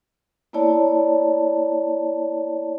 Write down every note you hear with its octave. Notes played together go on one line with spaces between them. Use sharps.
A#3 B3 E4 C#5 D5 A5